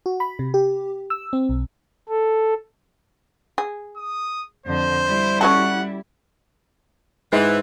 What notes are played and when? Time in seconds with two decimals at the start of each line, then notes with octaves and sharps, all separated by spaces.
0.06 F#4
0.20 B5
0.39 C3
0.54 G4
1.10 E6
1.33 C4
1.49 B1
2.09 A4
3.58 G#4
3.97 D#6
4.66 F2 D3 C5
5.06 G3 E4
5.41 C#4 F#4 A4 F#5
7.32 G#2 E3 C5